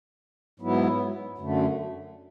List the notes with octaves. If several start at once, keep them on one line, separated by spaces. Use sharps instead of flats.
G#2 F#3 B3 E4
F#2 D3 A3